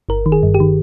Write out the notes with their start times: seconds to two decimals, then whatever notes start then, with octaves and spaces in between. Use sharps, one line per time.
0.09 G1 A#4
0.26 D#3
0.32 G#4
0.43 G2
0.54 G4
0.60 D#3